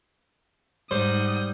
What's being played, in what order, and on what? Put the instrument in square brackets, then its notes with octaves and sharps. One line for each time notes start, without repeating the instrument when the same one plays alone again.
[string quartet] G#2 F#5 [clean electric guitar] G3 [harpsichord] C5 [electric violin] D#6 G6